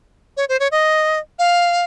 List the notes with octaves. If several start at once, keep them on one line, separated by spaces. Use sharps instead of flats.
C#5
C5
C#5
D#5
F5